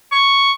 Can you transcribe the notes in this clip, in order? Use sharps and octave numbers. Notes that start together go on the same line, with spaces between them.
C#6